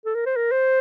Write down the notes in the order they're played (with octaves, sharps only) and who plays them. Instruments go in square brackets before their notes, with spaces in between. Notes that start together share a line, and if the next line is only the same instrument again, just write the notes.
[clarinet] A4
A#4
C5
A#4
C5